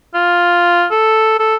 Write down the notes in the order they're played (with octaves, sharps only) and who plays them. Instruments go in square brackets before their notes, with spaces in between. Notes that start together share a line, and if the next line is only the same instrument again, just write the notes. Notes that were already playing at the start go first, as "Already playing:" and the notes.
[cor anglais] F4
A4
A4